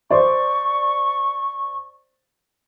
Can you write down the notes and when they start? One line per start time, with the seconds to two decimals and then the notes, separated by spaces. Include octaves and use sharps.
0.10 C5 D5 C#6